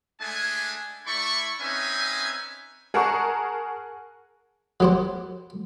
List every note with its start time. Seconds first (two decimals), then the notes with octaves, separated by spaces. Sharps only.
0.21 G#3 A3 D4 G#5
1.07 A3 E4 D5 B5 C#6
1.61 C4 C#4 D#4 B4 E5 G#5
2.94 G#4 A#4 F#5 A5 A#5 C#6
4.80 F#3 G4 C5